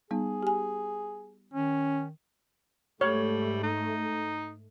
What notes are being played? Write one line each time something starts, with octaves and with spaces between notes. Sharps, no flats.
G3 B3 D#4 G#4
G4 G#5
D#3 C#4
G#2 G3 A3 C#5
D#4